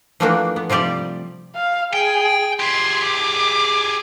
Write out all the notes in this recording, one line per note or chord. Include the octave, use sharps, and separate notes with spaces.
E3 F3 A3 A#3 D4 F#4
B3
C3 F3 G3 G4 D5
F5
G#4 G5
G4 G#4 C6
D6